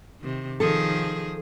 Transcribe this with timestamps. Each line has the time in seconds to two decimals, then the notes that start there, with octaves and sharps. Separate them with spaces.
0.20 C3 D#3
0.60 D#3 F3 G#4 A4